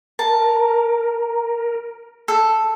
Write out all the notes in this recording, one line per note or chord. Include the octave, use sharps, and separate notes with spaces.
A#4 A5
A4